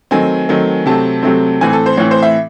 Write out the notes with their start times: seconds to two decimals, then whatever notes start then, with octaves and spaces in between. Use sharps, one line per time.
0.11 D#3 F#3 A3 C4 G#5
0.49 D#3 F#3 A3 C4
0.86 C3 F#3 A3 C4 A5
1.23 C3 F#3 A3 C4
1.61 A2 E3 C4 G#5
1.73 A4
1.86 C5
1.97 A2 E3 C4 C#5
2.11 C5
2.23 E5